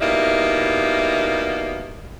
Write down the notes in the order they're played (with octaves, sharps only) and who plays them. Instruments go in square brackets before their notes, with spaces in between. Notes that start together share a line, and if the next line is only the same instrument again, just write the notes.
[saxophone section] B2 G3 A#3 D#4 E4